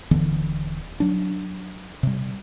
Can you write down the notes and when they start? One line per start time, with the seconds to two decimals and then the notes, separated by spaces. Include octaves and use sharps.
0.11 D#1 D3 E3 B3
1.00 F#3 D4
2.03 C3 G3